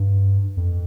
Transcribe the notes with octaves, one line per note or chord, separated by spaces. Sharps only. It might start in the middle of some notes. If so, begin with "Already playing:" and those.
Already playing: G2
F2